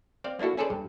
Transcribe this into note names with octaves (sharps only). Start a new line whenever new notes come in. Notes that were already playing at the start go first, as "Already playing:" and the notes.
C4 D5 F5
A#3 D4 E4 F#4 A4
C#4 G#4 A4 B4 C5 D5
G2